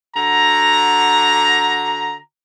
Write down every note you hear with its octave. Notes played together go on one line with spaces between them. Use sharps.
D3 F#4 A#5